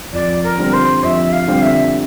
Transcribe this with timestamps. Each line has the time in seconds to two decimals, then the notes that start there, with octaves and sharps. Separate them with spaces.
0.13 F2 D5
0.43 A#4
0.58 D3 G3 C4
0.73 C5
1.03 F2 E5
1.32 F5
1.48 D3 G3 C4
1.62 E5